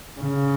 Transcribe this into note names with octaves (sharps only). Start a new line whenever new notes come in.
C#3